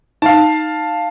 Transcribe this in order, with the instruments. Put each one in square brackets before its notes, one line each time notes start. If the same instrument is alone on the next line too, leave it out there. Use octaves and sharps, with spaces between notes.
[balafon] D#4 [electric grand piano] F5 A5